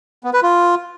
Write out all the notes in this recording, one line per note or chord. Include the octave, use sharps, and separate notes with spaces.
B3
B4
F4